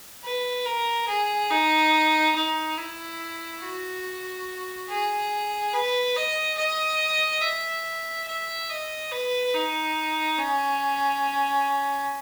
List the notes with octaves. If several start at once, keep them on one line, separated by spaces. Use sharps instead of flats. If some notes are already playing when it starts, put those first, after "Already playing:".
B4
A#4
G#4
D#4
D#4
E4
F#4
G#4
B4
D#5
D#5
E5
E5
D#5
B4
D#4
C#4